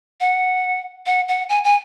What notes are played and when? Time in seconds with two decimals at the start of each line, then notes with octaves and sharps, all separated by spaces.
0.20 F#5
1.06 F#5
1.28 F#5
1.49 G#5
1.64 G#5